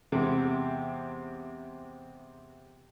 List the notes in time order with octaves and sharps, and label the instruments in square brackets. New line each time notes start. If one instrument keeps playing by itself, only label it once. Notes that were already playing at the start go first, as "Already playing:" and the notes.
[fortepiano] E2 C3 G#3 C4